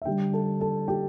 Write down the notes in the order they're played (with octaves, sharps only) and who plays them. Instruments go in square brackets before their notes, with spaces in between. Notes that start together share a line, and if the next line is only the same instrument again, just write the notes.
[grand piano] E5
D3 G3 G4 G5
A4 A5
A4 A5
G4 G5